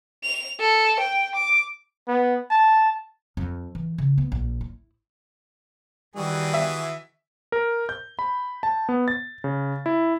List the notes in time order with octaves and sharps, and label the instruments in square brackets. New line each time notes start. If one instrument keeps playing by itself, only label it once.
[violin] F7
A4
G5
D6
[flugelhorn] B3
A5
[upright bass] F2
E3
C#3
B3
A#1
E4
[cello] D#3 [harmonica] E3 F#4 G#4 [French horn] G3
[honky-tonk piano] E5
[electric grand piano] A#4
G6
B5
A5
B3
A6
C#3
E4